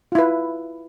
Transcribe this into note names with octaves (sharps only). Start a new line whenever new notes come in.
E4 F4 B4